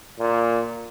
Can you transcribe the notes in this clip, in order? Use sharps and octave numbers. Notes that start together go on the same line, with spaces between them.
A#2